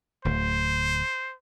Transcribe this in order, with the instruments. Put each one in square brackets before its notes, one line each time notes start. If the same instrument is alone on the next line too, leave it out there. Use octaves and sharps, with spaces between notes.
[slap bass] D1 D2 [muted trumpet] C5